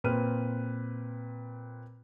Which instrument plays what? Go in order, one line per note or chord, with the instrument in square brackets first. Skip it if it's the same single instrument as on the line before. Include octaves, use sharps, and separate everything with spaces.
[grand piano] A#2 C4 B4 F6 D#7